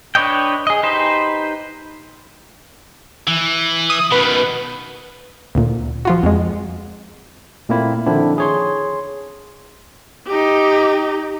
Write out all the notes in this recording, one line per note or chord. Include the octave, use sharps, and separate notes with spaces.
D4 B4 C#5 D#5 G5
G#4 D#5
D#4 G4 B4 C5
E3
D#6
B2 D#3 B4
D2 A#2
F3 F4 F#4
F2 G#3
A#2 A3 A#3 C4 E4
D3 D#3 F3 C4 D4 E4
G#4 C#5 C6
D#4 G4